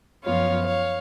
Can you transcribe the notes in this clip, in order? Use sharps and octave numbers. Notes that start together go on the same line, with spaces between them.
F#2 F3 B3 F4 C#5 F5
C#5 F5